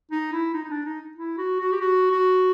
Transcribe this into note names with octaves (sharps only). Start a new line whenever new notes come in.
D#4
E4
D#4
D#4
D4
D#4
E4
F#4
F#4
G4
F#4
F#4